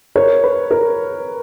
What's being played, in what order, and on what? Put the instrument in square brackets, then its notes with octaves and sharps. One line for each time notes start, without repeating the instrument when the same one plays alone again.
[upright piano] A#4 C#5
B4
A#4